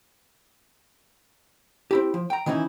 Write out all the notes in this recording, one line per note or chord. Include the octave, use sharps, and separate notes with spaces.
C4 E4 G4
F3
G5 A#5
D#3 E3 C#4 D#4 E4